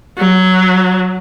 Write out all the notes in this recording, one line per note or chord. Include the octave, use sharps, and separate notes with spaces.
F#3